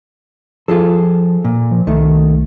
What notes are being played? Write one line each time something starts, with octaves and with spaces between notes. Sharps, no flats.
F3 F4 G#4 A4
A#2
F3
C2 D#3 A3